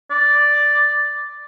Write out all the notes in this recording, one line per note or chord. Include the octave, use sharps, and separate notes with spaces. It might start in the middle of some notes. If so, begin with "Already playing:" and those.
D5